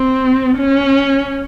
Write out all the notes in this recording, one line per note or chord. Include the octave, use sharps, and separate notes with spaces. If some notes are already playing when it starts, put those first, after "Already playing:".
Already playing: C4
C#4